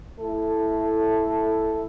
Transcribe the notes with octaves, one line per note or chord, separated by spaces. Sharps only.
A3 E4 A4